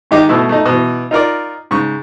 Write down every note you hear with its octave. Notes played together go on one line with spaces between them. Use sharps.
G#2 D#3 D#4 G4 D6
B2 A3 E4
A3 D#4
B2 E3
D#4 F4 A#4 D5
G#2 C#3 C#6